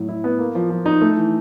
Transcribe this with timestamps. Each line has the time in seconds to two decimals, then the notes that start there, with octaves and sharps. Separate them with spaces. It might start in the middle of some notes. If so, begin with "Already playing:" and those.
Already playing: A2 F#3
0.09 E4
0.24 B3
0.39 A#3
0.55 F3
0.70 F3
0.86 D#4
1.01 A3
1.17 E3